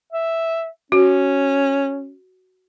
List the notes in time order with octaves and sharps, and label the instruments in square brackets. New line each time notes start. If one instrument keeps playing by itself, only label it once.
[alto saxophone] E5
[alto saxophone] C#4 [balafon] F#4